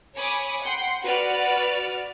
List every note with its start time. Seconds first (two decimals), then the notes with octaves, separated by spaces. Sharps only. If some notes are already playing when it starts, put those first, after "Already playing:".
0.15 C#5 G#5 B5 D6 D#6
0.62 F#5 G5 C6
1.03 F#4 B4 D5 F6